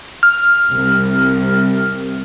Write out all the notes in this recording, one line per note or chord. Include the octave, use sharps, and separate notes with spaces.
F6
C2